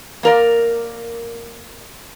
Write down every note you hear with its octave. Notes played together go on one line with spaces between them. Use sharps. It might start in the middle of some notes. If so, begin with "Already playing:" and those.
A#3 A#4 D5